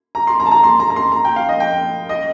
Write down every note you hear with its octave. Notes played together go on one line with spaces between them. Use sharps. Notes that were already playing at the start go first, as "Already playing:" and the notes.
A#5
C6
A#5
A5
A#5
C6
A#5
A#5
C6
A#5
G5
F5
D#5
G5
D#5